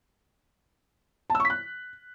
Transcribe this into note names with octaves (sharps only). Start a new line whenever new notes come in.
A5
E6
C#6
B6
F#6